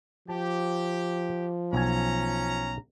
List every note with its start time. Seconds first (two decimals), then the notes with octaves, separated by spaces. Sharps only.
0.28 F3 G4 A5
1.73 B1 C#4 G#5 A#5